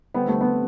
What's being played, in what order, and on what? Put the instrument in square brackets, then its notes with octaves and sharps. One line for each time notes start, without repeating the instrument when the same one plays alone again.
[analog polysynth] D3 G3 C4 [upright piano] B3
[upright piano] A3
B3